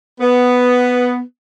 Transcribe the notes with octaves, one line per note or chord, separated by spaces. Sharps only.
B3